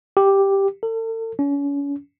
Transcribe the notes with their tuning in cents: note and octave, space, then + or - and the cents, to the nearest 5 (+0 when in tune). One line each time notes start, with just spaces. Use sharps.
G4 +0
A4 +40
C#4 +35